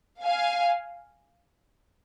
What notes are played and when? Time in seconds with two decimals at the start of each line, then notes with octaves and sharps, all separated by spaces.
0.24 F5 G#5